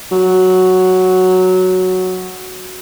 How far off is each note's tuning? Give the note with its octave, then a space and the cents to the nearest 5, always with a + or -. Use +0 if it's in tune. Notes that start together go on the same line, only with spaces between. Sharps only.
F#3 +0